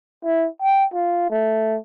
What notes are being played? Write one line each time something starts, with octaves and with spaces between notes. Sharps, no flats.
E4
G5
F4
A3